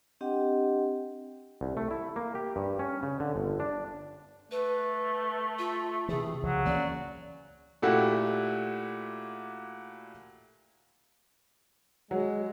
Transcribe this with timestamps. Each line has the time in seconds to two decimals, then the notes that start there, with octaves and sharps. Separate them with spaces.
0.21 C4 D4 G4 D#5 F#5 G5
1.61 C2
1.77 A3
1.91 E4
2.16 A#3
2.35 G4
2.56 G2
2.79 C#4
3.03 C#3
3.20 D3
3.36 G1
3.60 D4
4.51 A3 B4
5.59 F4
6.09 C3 E3 G#4
6.43 C#2 F3 F#3
6.65 E3 A#3 C#4 D5
7.82 A#2 A3 E4 F#4 G4
12.11 F#3 G#3